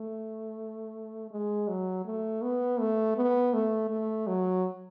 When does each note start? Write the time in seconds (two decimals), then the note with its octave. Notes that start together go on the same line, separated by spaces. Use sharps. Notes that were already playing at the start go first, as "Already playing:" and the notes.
Already playing: A3
1.31 G#3
1.68 F#3
2.06 A3
2.42 B3
2.80 A3
3.17 B3
3.54 A3
3.90 A3
4.27 F#3